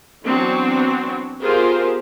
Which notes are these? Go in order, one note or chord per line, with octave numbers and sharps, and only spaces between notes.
E3 F#3 B3 C4 D4 F#4
B3 F4 G4 G#4 A#4 C5